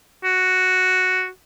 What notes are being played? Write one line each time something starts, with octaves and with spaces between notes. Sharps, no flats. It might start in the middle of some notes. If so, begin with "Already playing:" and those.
F#4